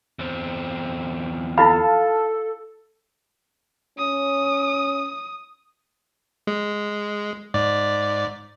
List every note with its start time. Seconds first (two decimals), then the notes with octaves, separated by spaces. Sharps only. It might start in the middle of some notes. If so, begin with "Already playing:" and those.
0.19 E2 C4
1.58 E4 F4 A4 F5 A5 B5
3.98 C#4 D#6
6.47 G#3
7.54 G#2 D5